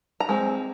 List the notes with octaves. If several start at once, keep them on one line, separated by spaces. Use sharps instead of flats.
A#5
G#3 C4